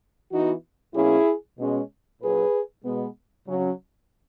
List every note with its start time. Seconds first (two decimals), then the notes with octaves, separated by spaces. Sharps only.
0.32 E3 B3 D#4 F#4
0.95 B2 F#3 A#3 C#4 E4 G#4
1.58 B2 G#3 C#4
2.22 A#2 F#3 C#4 G#4 B4
2.85 B2 G#3 B3
3.48 C#3 F#3 C#4